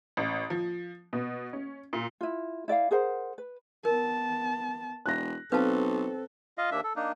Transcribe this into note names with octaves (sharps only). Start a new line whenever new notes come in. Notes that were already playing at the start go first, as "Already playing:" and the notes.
A1
F3
B2
C#4
A#2
E4 F4
E4 D5 E5 F5
G#4 A#4 C5 F#5
B4
B3 A#4 A5
E1 F#6 A#6
B1 C4 A4 B4 F5 A5
F4 D#5 F5
D#2 A#3 D4 E5
A4
A#3 D4 D#4